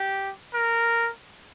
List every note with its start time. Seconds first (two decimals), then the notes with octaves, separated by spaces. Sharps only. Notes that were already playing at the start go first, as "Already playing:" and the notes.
Already playing: G4
0.54 A#4